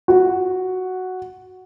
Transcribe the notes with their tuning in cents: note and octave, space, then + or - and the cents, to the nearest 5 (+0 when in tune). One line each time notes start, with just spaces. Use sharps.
F#4 +0